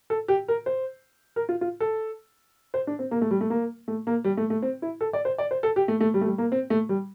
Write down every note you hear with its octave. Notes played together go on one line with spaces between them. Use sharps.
A4
G4
A#4
C5
A#4
F4
F4
A4
C5
D4
C4
A#3
A3
G3
A3
A#3
A3
A#3
G3
A3
A3
C4
E4
A4
D5
C5
D5
C5
A4
G4
A3
A3
G3
A3
G3
A#3
C4
A3
G3